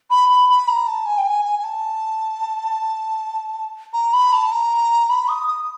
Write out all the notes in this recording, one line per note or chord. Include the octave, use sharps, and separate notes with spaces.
B5
B5
B5
A#5
A5
G#5
G5
G#5
G#5
G#5
A5
A#5
B5
A5
A#5
B5
D#6
D#6